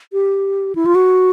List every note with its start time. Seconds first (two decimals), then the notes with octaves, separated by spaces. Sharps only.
0.13 G4
0.75 E4
0.86 F4
0.95 F#4